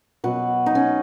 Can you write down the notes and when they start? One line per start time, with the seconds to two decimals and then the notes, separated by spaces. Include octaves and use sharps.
0.24 B2 F#3 F#4 B4
0.66 D#4
0.75 C#4